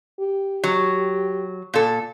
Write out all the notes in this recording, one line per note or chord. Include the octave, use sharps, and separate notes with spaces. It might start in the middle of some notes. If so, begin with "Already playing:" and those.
G4
F#3
A#2 A4